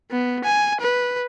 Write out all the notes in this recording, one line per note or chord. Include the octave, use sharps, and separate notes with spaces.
B3
G#5
B4